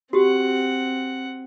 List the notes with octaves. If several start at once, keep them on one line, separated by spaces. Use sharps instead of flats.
C4 F#4 G4 F#5